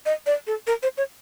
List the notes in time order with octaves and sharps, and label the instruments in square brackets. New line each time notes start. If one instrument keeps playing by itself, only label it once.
[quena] D#5
D5
A4
A#4
C5
C#5